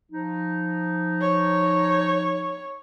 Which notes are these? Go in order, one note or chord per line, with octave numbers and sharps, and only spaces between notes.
F3 D#4
C#5